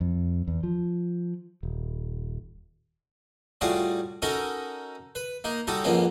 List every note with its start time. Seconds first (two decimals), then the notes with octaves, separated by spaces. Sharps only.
0.01 F2
0.48 E2
0.63 F3
1.63 D#1
3.61 A2 G3 F4 F#4 G#4 D5
4.22 C#4 D#4 F#4 A4 A#4
5.15 B4
5.44 A#3 D#4
5.67 G3 D#4 F#4 A4
5.84 F2 G#2 A#3 B3 C#4